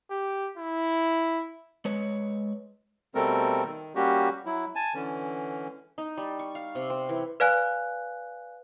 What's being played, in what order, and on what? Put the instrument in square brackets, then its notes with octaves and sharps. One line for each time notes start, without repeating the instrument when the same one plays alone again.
[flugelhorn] G4
E4
[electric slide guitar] G#3 B4 C#5
[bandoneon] B2 G3 A3 C4 A4 A#4
D#3
G3 A#3 C#4 F#4 G4
F#3 E4
G#5 A5
D3 E3 C#4
[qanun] D#4
G3
C#6
F5
C3
C4
E3
[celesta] B4 D5 F5 G#5 F#6